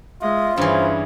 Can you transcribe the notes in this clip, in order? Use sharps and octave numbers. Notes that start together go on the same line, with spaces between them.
G#3 F4 D#5 E5
G2 E3 C#4 G#4 C5